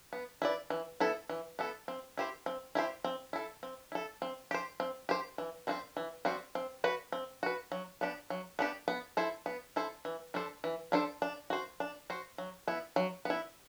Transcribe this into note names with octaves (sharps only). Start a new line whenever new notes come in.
B3
E4 B4 D5
E3
B3 E4 A4
E3
B3 E4 A4
C4
E4 G4 C5
C4
E4 G4 C5
C4
E4 A4
C4
E4 A4
C4
G4 C5
C4
G4 C5
E3
G3 C4 F#4 C5
E3
G3 C4 F#4 C5
C4
F#4 B4
C4
F#4 B4
F#3
B3 D4 G4
F#3
B3 D4 G4
B3
E4 A4 C5
B3
E4 A4 C5
E3
G3 D4 A4 C5
E3
G3 D4 A4 C5
D4
F#4 C5
D4
F#4 C5
F#3
B3 E4
F#3
B3 E4